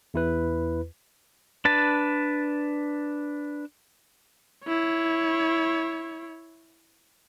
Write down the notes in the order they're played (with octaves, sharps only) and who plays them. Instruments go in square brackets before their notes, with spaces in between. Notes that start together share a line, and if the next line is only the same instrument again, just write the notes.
[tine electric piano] E2 E4 B4
[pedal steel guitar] D4 B4 A5
[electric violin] E4 C#5